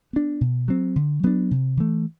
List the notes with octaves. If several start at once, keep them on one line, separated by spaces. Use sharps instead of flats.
B3 D4
B2
F#3 C4
D3
F#3 B3 D4
C3
E3 A3